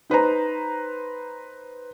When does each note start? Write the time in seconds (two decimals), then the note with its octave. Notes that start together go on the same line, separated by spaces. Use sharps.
0.10 D#4 B4 C5 A#5